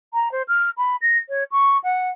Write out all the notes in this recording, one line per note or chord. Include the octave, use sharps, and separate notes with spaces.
A#5
C5
F6
B5
A#6
C#5
C#6
F#5